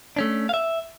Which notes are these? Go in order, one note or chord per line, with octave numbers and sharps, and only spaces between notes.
A3 C#4 D4
E5 F5